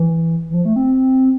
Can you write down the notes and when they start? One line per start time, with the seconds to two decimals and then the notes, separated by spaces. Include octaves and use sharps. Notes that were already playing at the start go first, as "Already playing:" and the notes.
Already playing: E3
0.50 E3
0.54 F3
0.65 A3
0.76 C4